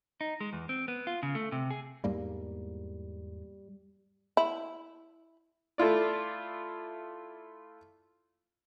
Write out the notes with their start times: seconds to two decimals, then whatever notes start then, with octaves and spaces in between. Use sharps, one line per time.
0.21 D#4
0.41 G#3
0.53 E2
0.69 C4
0.88 B3
1.07 F4
1.23 C#3
1.35 A3
1.52 C3
1.71 G#4
2.04 E2 G#2 G3 A#3
4.37 E4
5.78 A3 E4 F4 D5